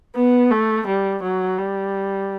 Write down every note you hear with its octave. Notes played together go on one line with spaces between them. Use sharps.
B3
A3
G3
F#3
G3